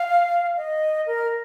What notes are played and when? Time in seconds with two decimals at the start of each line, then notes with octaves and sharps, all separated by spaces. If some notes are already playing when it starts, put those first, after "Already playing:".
Already playing: F5
0.57 D#5
1.07 A#4